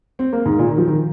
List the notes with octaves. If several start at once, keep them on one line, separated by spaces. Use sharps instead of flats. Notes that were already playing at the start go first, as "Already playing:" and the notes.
C4
A#3
G#2
A#2
D#3
F3
D#3